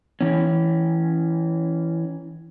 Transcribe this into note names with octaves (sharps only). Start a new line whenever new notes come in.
E3 C#4